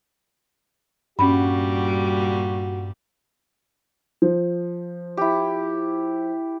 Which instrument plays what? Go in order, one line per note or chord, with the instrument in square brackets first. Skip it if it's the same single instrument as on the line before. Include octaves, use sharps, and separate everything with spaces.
[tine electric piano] G2 [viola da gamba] A#2 G3 [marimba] C#4 B5 [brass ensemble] F#4
[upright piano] F3
[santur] E4 G4